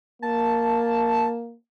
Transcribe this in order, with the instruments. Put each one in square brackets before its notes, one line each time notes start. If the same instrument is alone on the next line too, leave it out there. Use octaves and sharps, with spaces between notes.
[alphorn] A#3 [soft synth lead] A5